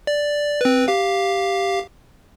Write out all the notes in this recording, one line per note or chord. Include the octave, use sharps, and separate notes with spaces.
D5
C4 B4
G4 F5